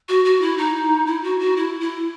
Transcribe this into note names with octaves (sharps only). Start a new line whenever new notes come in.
F#4
F#4
E4
D#4
E4
F#4
F#4
E4
E4